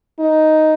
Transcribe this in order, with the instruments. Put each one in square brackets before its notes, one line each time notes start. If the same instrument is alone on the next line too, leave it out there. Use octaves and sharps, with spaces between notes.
[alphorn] D#4